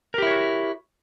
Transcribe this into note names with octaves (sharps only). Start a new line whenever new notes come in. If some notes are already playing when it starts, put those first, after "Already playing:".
E4 F#4 G4 A#4 C#5